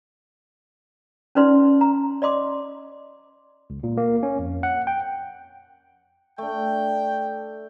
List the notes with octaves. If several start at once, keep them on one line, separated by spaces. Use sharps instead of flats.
C#4 D#4 B4 D5 C6
A#5
D5 D#5 C6 D6
C#2
A#2
A#3
C#4
F2
F#5
G5
A3 D4 G5